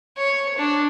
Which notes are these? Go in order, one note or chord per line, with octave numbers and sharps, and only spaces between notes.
C#5
D4